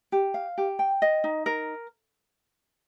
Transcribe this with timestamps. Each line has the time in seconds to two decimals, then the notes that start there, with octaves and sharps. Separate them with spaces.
0.12 G4
0.34 F5
0.58 G4
0.79 G5
1.02 D#5
1.24 D#4
1.46 A#4